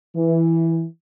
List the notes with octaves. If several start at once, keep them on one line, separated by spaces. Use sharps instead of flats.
E3